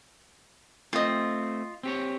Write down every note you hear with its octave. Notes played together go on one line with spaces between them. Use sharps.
A3 C4 F4 D#5
C4 G4 C#5